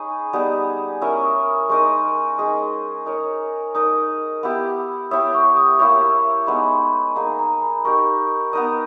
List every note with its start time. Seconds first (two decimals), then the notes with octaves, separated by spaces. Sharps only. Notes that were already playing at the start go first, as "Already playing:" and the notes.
Already playing: C#4 D#4 G#4 D#5 B5 C#6
0.33 G3 B3 D#4 G#4
1.01 C#4 E4 A#4 E5 C#6
1.14 C#6
1.24 D#6
1.47 D#6
1.69 G#3 D#4 A#4 D#5 C#6
2.38 G#3 D#4 G#4 D#5
3.06 D#4 A#4 C#5
3.75 D#4 A#4 D#5 D#6
4.43 B3 E4 G4
5.11 E4 G4 C#5 E5 D#6
5.34 C#6
5.57 D#6
5.79 A#3 E4 G4 C#5 C#6
6.47 G#3 B3 D#4 B5
7.16 A#3 D#4 G#4 A#5
7.39 A#5
7.62 B5
7.85 D#4 G4 A#4 C#6
8.53 B3 D#4 A#4 D#5 A#5